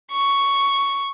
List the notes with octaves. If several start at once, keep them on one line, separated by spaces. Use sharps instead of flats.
C#6